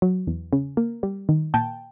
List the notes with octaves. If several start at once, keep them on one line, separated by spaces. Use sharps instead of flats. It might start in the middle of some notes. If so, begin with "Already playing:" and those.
F#3
E2
C#3
A#3
G3
D#3
A#2 G5 A5